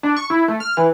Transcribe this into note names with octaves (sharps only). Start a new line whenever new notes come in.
D4
C#6
E4
A3
F6
E3